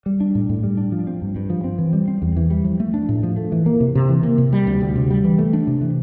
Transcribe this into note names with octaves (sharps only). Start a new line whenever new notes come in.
G3
D4
A2
A2
G3
D4
F3
C4
G2
G2
F3
C4
E3
G3
C4
E2
E3
G3
F3
A3
D4
A2
F3
A3
E3
A#3
C3
C3
E3
A#3
C3
G3
D2
D2
C3
G3
E3
A3
D4
C3
E3